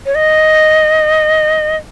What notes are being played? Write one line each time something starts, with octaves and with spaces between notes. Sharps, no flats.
C#5
D#5